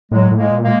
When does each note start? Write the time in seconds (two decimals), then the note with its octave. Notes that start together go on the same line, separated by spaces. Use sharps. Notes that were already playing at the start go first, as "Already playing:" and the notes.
0.12 A2 F#3 G#3
0.31 A2
0.38 G#3 A#3
0.51 A#2
0.64 G#3 A#3